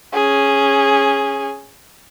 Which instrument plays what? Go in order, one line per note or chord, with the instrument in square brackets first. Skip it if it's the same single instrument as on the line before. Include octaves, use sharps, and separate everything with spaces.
[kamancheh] C#4 G#4